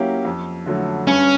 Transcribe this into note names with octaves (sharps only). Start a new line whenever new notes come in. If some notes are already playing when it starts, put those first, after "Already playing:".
Already playing: F#3 A#3 C#4 E4 G4
F2
D3 F#3 A3
G2 C#4